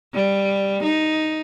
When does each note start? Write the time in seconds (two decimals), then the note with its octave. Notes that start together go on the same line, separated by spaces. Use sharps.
0.14 G3
0.83 D#4